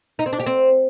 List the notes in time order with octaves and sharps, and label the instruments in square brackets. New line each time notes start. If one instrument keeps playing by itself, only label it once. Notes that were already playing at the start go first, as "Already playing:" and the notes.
[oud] D#4
C4
D4
G4
C4